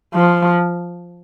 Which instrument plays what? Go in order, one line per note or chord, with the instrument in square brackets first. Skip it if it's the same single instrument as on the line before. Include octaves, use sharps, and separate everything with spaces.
[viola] F3